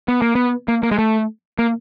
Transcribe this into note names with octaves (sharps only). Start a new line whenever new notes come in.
B3
A#3
B3
A#3
A#3
G#3
A3
A#3